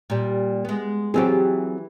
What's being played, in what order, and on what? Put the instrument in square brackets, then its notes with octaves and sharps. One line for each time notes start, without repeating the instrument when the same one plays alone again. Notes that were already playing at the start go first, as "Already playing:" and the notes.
[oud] A#2 G3
G#3 B3
[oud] E3 F4 G4 [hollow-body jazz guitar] F#3 C4 G#4